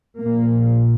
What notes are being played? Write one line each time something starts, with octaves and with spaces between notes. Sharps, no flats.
A#1 A#2 A#3